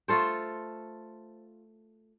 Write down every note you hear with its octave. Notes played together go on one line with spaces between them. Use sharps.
A3 F4 A4 C5